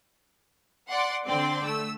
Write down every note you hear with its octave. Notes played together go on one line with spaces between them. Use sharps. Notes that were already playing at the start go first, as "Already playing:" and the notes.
D5 F#5 C6
D3 C4 D5 G5 C6
A3 E6